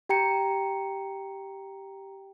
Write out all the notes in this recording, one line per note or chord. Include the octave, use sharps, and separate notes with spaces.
G4 G5 A#5 C#7